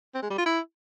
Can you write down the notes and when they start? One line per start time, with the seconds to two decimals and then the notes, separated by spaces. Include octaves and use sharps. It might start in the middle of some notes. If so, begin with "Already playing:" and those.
0.15 C4
0.22 G#3
0.30 G3
0.38 F4
0.46 E4